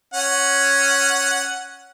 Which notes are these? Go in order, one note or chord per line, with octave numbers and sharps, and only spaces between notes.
C#4 F#5